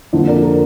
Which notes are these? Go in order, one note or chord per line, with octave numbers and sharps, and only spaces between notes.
F2 D3 F3 A#3
A#4 D5
F4 A#4